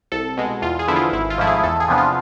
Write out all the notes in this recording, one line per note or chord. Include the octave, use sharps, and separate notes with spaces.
C2 A4
B2 G#3
E2 F4
G#4
D3 F3 B3 E4
F4
G#1 E4
F4
G#2 F3 A3 E4
G#4
E2 A4
G#4
C3 F3 B3 D4
F4